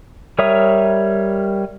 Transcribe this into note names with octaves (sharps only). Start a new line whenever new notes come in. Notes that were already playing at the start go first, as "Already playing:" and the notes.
G3 A#4 C#5 E5 D#6